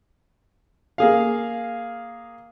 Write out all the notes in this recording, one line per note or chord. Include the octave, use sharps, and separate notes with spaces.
A#3 G#4 F5